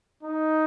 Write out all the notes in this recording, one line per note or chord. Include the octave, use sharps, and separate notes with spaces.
D#4